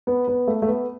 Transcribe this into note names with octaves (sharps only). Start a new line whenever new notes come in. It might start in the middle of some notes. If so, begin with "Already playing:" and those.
B3
B3
A3
A3
B3